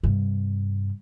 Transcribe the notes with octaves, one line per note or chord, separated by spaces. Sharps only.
G2 C3